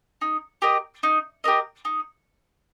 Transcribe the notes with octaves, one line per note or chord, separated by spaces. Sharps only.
D#4
G4 A#4 D#5
D#4
G4 A#4 D#5
D#4